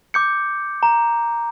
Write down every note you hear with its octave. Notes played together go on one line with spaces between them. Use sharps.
D6 G6 C#7
A#5